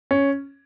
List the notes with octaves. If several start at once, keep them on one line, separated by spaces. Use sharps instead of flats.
C#4